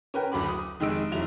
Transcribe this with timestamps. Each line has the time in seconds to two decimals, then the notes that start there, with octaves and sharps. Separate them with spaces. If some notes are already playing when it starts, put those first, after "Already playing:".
0.14 C#4 A#4 B4 G5
0.32 F#1 D2 F#3 B5 D6
0.49 D#6
0.80 F1 D#3 G#3 D#4 E6 D7
1.11 F1 F#3 E4 F7